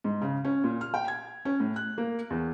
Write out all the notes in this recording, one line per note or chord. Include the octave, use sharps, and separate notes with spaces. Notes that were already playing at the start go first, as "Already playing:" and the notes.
G#2
C#3
C#4
A#2
F6
G5
G#6
C#4
A2
F#6
A#3
E2